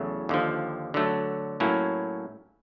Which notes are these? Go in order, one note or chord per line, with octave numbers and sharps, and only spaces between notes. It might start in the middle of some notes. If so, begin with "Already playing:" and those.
Already playing: E2 C#3 F#3 A3
D#2 D3 F3
D3 F#3 A3
A2 F#3 A#3 C#4 E4